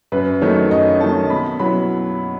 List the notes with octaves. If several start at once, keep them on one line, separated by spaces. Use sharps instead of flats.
F#2 B4
D#3 F#3 A3 D#4 C#5
F#2 D#5
D#3 F#3 A3 D#4 A5
B2 B5
F#3 B3 E4 B5